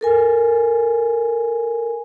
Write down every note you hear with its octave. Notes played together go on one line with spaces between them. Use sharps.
A4 A#4 G#5